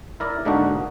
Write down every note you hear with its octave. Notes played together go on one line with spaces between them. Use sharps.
E4 A#4 D5
G#2 D3 A#3 D4 D#4 F#4